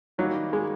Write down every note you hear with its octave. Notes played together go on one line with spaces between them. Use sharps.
D#3 F#3 G3 A#3 D#4 F#4
G#3